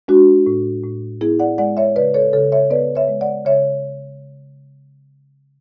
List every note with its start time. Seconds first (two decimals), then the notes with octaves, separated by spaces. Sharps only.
0.08 G#3 D4 F#4
0.47 A2
0.83 A2
1.21 B3 E4 G#4
1.40 D5 F#5
1.58 G#3 D5 F#5
1.77 C#5 E5
1.96 C#3 B4 D5
2.14 A4 C#5
2.33 C#3 A4 C#5
2.52 C#5 E5
2.70 B3 B4 D5
2.95 C#5 E5
3.08 G#3
3.21 D5 F#5
3.46 C#3 C#5 E5